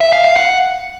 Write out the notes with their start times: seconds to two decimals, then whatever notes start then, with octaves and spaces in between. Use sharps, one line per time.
0.01 E5
0.13 F5
0.24 F5
0.36 F#5